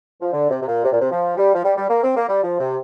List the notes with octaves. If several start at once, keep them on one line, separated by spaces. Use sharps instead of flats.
F3
D3
C3
C3
A#2
C3
A#2
C3
F3
G3
F3
G3
G3
A#3
C4
A#3
G3
F3
C3